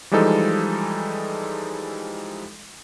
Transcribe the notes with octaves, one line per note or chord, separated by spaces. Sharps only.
E3 F3 G3 G#3 D#4 A4